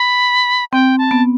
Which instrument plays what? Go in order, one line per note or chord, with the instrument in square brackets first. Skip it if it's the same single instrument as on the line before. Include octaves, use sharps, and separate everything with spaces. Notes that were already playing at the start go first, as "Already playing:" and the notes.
Already playing: [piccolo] B5
[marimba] C4 [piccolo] G5
[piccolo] A5
[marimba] B3